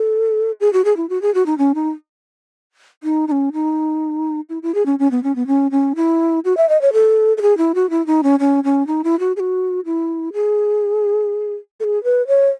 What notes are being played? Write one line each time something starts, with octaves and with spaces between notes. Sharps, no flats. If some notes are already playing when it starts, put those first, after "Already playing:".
Already playing: A4
G#4
F#4
G#4
E4
F#4
G#4
F#4
D#4
C#4
D#4
D#4
D#4
C#4
D#4
E4
E4
G#4
C#4
C#4
B3
C#4
B3
C#4
C#4
E4
F#4
E5
D#5
C#5
A4
A4
G#4
E4
F#4
E4
D#4
C#4
C#4
C#4
D#4
E4
F#4
G#4
F#4
E4
G#4
A4
G#4
B4
C#5